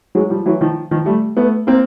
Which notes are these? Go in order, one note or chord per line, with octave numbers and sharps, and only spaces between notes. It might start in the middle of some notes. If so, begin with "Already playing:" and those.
F#3 G#3
F3 G3
E3 F#3
D#3 F3
D#3 F3
G3 A3
A3 B3
A#3 C4